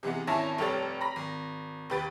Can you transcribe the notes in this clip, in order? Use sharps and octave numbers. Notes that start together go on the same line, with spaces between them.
C3 E3 G#3 B3
G#1 C#4 E4 C#5 A5 A#6
F1 G2 G4 A4 C#5 A6
A#5 B5 A#6
G#1
D#2 G4 B4 G5 A6